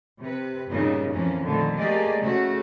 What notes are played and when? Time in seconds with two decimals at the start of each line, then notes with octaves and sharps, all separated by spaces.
0.21 C3 B4
0.69 G2 A#2 C#3 B3 D#4
1.10 F2 E3 A#3 C#4
1.43 A#2 D3 D#3 A3
1.77 A3 A#3 G4 G#4 D5 D#5
2.21 C#3 A3 F#4